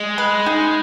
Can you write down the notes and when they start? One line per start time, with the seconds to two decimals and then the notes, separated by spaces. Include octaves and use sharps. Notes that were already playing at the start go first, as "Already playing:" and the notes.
Already playing: G#3
0.18 B4
0.46 D#4